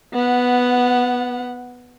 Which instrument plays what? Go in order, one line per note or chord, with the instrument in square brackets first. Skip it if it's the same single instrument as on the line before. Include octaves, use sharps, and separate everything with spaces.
[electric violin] B3 F#5